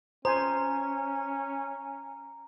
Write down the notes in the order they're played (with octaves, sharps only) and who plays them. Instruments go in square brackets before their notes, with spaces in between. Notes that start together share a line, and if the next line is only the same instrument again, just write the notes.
[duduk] C#4 [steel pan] C5 G#5 [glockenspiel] A#5